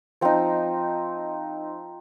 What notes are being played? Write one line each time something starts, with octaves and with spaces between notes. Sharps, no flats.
F3 C4 D#4